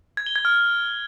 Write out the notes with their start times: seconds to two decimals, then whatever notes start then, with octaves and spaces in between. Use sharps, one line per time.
0.17 G#6
0.26 G7
0.36 G#6
0.45 F6